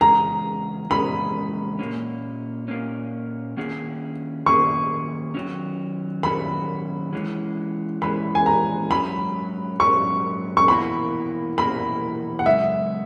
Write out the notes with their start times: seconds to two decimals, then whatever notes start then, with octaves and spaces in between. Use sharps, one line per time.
0.01 E2 C#3 G#3 C#4 G#4 A#5
0.90 E2 C#3 G#3 C#4 G#4 B5
1.79 A#2 A#3 C#4
2.68 A#2 A#3 C#4
3.57 D#3 A#3 C#4 G#4
4.46 D#3 A#3 C#4 G#4 C#6
5.34 D#3 F#3 C#4
6.23 D#3 F#3 C#4 B5
7.13 E3 G#3 C#4
8.02 E3 G#3 C#4 B5
8.35 G#5
8.46 A#5
8.90 G#2 F#3 C#4 B5
9.80 G#2 F#3 C#4 C#6
10.57 C#6
10.68 E2 B2 A#3 E4 A#4 B5
11.57 E2 B2 A#3 E4 A#4 B5
12.39 F#5
12.46 F#2 C#3 G#3 E5